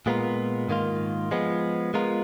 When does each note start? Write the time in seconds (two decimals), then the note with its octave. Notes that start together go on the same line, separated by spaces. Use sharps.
0.06 A#2 G#3 B3 F4 A#4
0.68 G#2 D#3 A#3 F4
1.31 F3 G#3 B3
1.94 G#3 B3 F4 A#4